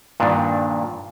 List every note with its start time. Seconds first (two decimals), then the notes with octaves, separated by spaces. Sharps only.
0.20 G2 A#2 D#3 D4